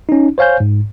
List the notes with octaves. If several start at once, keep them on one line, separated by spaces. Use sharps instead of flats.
C#4 D#4
C5 C#5 F5 G#5 G6
G#2